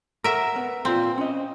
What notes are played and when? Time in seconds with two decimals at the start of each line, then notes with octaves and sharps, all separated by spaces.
0.24 A#4 E5 F#5 A#5
0.56 B3
0.85 A#2 C4 F4
1.18 C#4 D#5